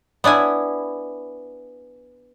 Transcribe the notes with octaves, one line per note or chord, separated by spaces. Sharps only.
B3 D4 E4 G#5